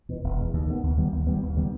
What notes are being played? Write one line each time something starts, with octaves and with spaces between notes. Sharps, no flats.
E2 B2
E1
E2 B2
D#2
D#3 G3 B3
D#2
D#3 G3 B3
D#2
D#3 G3 B3
D#2
D#3 G3 B3